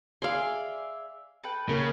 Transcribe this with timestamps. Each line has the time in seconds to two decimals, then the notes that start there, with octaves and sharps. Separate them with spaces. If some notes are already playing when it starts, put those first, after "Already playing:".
0.22 G#4 D5 E5 F5 C6
1.44 A4 B4 G5
1.69 C#3 A#3